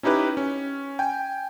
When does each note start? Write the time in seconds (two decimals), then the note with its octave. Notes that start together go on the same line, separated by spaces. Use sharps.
0.03 C#4 D#4 E4 G4 B4
0.37 C#4
0.99 G5 G#5